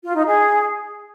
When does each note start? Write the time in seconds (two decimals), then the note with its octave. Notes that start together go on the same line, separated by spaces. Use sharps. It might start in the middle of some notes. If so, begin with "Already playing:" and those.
0.03 F4
0.15 D#4
0.26 G#4